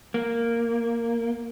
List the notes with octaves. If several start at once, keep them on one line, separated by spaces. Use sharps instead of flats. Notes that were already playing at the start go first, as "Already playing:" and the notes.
A#3